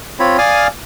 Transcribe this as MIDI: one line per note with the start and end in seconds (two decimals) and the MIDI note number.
0.20 0.37 60
0.20 0.37 65
0.20 0.37 73
0.20 0.37 83
0.38 0.67 74
0.38 0.67 77
0.38 0.67 80
0.38 0.67 87
0.38 0.67 89